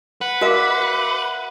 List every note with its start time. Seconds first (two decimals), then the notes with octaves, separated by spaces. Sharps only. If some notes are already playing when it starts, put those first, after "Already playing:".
0.21 B4 F#5
0.41 F#4 A#4 D5 E5 F5